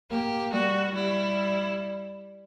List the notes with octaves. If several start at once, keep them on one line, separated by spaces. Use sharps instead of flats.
A#3 G4
G3 F#4
G3 E4